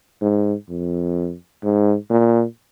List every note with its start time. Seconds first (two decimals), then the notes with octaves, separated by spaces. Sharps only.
0.21 G#2
0.69 F2
1.63 G#2
2.10 A#2